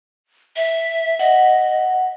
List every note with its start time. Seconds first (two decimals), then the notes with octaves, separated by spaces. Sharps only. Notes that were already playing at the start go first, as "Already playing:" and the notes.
0.56 E5
1.19 D#5 F#5